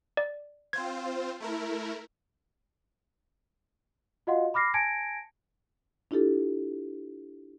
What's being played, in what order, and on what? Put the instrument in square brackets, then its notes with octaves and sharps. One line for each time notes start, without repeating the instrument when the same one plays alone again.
[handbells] D5
[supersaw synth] C4 F4 C5 [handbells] G#6
[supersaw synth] A3 E4 A#4
[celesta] F4 F#4 D#5 F5 F#5 C6
B5 D6 F6 A#6 C7
G#5 A5 G#6 A#6 C#7 D7
[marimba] D4 E4 F4 G4 A4